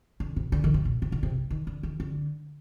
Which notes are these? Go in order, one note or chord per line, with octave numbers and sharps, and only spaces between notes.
D3
C3
D3
D#3
C3
A#2
C3
D3
C3
D#3
D3
D#3
D3